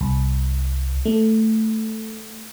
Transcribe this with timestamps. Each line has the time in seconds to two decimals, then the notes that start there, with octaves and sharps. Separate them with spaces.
0.01 C2
1.05 A3